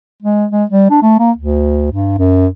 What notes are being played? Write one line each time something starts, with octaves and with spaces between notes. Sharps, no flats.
G#3
G#3
G3
D4
A3
A#3
D2
G2
F#2